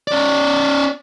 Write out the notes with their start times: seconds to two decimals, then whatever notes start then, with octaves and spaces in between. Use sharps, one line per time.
0.08 C#4 D5